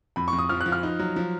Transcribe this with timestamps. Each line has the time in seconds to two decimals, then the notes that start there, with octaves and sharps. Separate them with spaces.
0.16 F2 B5
0.28 F2 C#6
0.39 D#6
0.49 F3 F6
0.61 F#6
0.66 F3
0.72 F6
0.83 D#4
0.99 F#3
1.16 F3